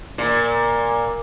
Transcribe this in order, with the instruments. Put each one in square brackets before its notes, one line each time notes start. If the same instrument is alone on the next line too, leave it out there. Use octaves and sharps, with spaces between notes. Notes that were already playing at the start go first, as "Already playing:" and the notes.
[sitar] A#2